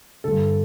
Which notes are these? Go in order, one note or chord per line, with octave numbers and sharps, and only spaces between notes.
G2 D3 A4